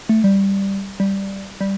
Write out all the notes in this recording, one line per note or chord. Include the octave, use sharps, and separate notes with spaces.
A3
G3
G3
G3